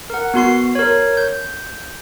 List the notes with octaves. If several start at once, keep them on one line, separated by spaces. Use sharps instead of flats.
A#4 F#5
B3 F#4 C6 C7
A#4 C#5
G6